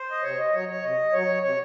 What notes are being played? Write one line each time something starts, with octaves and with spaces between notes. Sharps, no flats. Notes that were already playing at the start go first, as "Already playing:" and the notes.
Already playing: C5
D#5
C3 C#5
D#5
F#3 C#5
C#5
C3 D#5
F#3 C#5
C3 C#5